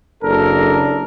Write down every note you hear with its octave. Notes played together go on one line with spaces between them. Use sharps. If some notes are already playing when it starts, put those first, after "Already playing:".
F#1 D4 A4 A#4